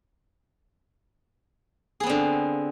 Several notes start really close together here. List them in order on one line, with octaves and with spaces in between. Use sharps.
G#4 B3 C4 D3